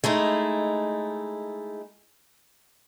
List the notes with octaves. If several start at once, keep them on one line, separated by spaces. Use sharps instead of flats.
G#3 A3 D#4 E4